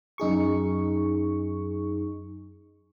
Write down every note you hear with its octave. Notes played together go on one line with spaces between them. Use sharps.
F#2 D#4 G#4 C#6